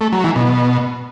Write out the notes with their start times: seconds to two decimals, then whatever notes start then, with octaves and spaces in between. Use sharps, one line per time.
0.01 A3
0.12 F#3
0.24 E3
0.36 B2